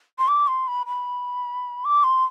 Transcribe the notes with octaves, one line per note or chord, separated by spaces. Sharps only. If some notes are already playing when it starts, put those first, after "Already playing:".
C6
D6
C6
B5
B5
D6
C6